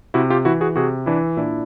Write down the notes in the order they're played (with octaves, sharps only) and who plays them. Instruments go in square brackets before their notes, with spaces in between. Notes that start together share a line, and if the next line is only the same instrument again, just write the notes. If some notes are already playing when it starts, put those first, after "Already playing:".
[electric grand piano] C3 E4 F#4
F4 G4
E3 E4 F#4
F#4 G#4
C3 F#4 G#4
E3 D4 E4
A#2 D4 E4